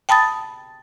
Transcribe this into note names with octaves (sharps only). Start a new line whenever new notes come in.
G5 A5 B5 D#6 A6